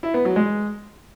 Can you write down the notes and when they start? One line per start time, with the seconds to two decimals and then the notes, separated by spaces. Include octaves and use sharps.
0.03 E4
0.14 B3
0.25 F#3
0.36 G#3